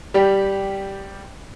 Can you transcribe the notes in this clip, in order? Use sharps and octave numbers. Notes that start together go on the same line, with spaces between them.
G3 G4